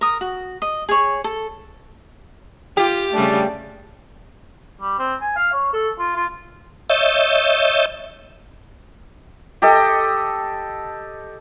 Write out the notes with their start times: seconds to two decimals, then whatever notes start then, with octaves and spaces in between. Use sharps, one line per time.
0.01 A#4 D#6
0.21 F#4
0.62 D#5
0.89 G#4 C#5
1.24 A4
2.77 F4 G4
3.14 C#3 G3 A3 D4 D5
4.81 G3
4.99 C4
5.21 G#5
5.36 F5
5.53 C#5
5.74 A4
5.99 F4
6.16 F4
6.90 C#5 D#5 E5 E6 G6 A6
9.62 G4 A4 D#5